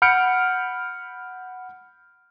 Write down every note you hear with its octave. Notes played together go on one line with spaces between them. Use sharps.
F#5 B5 F6 G6 C#7 D7